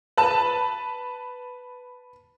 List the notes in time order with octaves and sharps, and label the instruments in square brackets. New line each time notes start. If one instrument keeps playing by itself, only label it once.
[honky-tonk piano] B4 A5